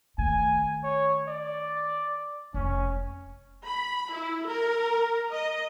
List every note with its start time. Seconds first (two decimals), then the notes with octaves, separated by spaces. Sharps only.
0.18 D#3 A3 G#5
0.84 C#5
1.28 D5
2.54 F1 C#4
3.66 B5
4.12 E4
4.47 A#4
5.32 D#5